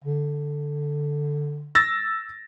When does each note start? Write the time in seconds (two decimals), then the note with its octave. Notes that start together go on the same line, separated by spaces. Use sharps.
0.04 D3
1.75 E6 A6 A#6